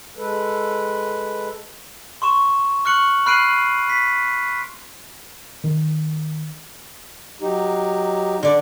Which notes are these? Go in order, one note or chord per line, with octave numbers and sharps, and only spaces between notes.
G#3 A4 B4
C6 C#6 E7
C#6 F6 F#6 C#7 F#7
B5 F6 F#6 C7 D7 D#7
B6
D#3
F#3 D#4 G4
D3 D5